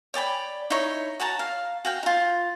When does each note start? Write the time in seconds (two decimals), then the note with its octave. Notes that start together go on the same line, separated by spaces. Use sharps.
0.14 C#5 D5 G5 B5
0.70 D#4 E4 C#5
1.20 F#4 C#5 A5 A#5
1.39 F5
1.85 F#4 F5 G5
2.03 D#4 F4